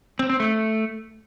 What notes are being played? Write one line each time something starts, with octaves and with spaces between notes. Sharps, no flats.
C4
C4
A3